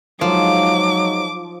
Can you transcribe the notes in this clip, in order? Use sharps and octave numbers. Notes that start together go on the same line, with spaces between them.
F3 F#3 G#3 D#4 D6